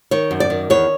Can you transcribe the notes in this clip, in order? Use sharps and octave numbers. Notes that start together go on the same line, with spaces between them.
D#3 C#5
F#2
D5
D#3
E2 C#5